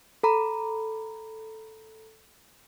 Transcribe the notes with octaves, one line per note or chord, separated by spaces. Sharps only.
A4 A#5 B5